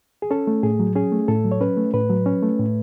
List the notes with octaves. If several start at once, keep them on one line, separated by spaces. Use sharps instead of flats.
G#4
C#4 A4
A3
A2 G#4
F#3
C#4 G#4
A3
A2 A4
F#3
C#5
C#4 B4
A3
A2 B4
F#3
C#4
A3
A2